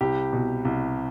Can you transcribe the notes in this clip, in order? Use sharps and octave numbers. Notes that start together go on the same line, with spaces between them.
C2 G4
B2
C2